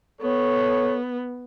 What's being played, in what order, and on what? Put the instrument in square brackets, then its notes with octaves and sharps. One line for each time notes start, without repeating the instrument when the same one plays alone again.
[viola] B3 [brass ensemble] A4 C#5